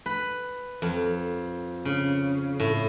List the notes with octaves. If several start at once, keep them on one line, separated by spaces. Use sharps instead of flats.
B4
F2
C#3
A2